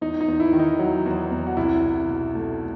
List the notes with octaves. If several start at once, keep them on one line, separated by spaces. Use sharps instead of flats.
E2 D#4
D#4
E2
E4
D#3
D#4
F#3
E2
E2
F#4
C2 E4
C2
B2
A3